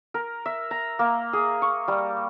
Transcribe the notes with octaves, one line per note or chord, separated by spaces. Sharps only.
A#4
E5
A#5
A#3
G#4
C#6
G3